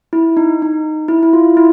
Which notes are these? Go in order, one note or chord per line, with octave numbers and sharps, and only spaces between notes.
E4
D#4
D#4
E4
E4
F4
E4